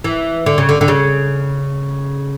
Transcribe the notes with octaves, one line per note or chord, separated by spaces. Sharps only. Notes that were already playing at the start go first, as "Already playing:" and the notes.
E3
D3
C#3
D3
D3
C#3